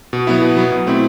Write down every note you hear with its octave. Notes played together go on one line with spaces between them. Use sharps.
B2
F#3 B3 E4
B2
F#3 B3 E4
B2
A3 C4 E4